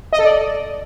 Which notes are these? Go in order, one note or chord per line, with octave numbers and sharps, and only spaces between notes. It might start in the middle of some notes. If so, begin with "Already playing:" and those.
D#5
A4
D5